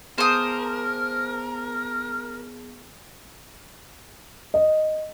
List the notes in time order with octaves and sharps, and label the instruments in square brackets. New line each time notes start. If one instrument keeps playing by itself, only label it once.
[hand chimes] B3 G#4 A5 [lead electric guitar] A#4 [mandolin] C5 D#6
[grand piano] D#5